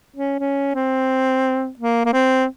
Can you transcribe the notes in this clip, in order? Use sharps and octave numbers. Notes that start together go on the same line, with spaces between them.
C#4
C#4
C4
A#3
A#3
C4